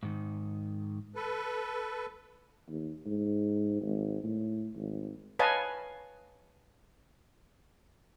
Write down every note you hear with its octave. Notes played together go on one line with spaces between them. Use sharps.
G#2 D#3
A4 B4
D#2
G#2
G#1
A2
G#1
B4 C#5 D#5 F5 G#5 A5